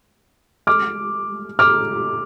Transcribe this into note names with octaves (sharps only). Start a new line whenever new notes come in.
D6 F6
D6 F6